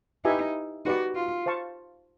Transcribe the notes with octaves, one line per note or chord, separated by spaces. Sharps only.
D#4 E4 G4 B4 E5 G#5
D#4 F#4 G4 B4 D5
F4
C5 F5 A5 C#6